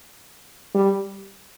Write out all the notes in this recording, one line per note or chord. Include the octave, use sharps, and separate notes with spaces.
G3